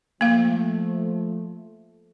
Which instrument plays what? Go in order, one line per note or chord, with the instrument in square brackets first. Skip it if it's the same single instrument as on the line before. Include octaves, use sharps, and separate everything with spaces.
[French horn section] F3 A3 [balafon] A#3 F5